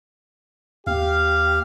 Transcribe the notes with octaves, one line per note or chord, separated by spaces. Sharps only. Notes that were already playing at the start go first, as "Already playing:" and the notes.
D#2 G4 F5